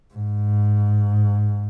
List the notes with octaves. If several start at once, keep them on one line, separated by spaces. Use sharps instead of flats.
G#2